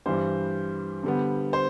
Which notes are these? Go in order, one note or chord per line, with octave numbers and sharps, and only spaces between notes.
G2 E3 G3 C5
D3 G3 B3
C5